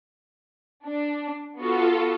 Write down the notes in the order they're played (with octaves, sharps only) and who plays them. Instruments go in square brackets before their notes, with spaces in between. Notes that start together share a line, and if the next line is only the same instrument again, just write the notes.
[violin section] D4
[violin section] B3 F#4 [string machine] F4 A4